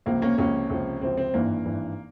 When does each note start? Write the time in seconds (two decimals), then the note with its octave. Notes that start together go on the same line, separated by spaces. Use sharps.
0.06 C#2 C3 F3 A#3
0.22 A#3 C#4
0.38 C#2 C3 F3 A#3 C#4
0.70 C#2 C3 F3
1.01 C#2 C3 F3 C4
1.17 C4
1.34 G#1 G2 E3 A#3
1.65 G#1 G2 E3